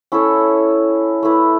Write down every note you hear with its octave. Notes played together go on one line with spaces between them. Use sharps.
C#4 E4 A4 C#5
A3 E4 B4 D5